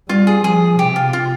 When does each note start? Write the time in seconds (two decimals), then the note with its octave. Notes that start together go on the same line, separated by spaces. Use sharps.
0.09 G3 F4
0.27 G#4
0.44 F3 G#4
0.79 C3 G4
0.96 F4
1.13 F4